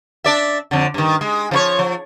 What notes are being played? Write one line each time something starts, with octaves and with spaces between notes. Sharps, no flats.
D4 D5 E5
F2 D3
G2 D#3
G#3
F3 E4 C#5
F3